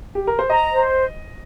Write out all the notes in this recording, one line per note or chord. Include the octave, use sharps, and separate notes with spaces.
G4
A#4
C5
D#5 A#5
C5